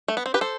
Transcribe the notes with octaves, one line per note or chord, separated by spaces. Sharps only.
A3
B3
C4
G4 B4
A4 C5